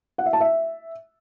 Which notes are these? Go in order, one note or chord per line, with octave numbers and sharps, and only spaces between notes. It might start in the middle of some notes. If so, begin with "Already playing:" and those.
F#5
E5
A5
E5